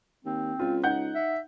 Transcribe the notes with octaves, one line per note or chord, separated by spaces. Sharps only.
D#2 C4
C#2 F4
D#4 F#5 G6
E5